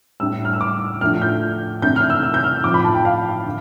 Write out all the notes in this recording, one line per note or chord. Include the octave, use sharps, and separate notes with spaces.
A2 G3 D4 E6
F6
E6
D6
A2 F3 A3 D4 F6
G6
C3 E3 A3 D4 G6
F6
E6
E6
G6
F6
A2 F3 C4 D6
B5
A5
G5
F5
D3